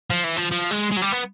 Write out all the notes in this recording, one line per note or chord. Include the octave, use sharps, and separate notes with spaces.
F3
E3
F3
F3
G#3
G#3
F#3
G3
B3